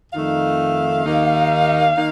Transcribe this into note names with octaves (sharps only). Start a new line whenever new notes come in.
F2 D#3 A3 D#4 F5
D#2 D#3 A#3 D#4
D#3 A#3 D#4